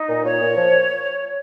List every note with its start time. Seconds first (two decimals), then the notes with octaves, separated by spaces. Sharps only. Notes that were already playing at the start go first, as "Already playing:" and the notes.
Already playing: D#4
0.09 A#2
0.24 A#2 C#5
0.41 A#2
0.57 F3